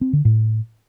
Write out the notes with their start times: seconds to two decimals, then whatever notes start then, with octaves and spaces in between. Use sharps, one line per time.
0.01 C4
0.13 D3
0.25 A2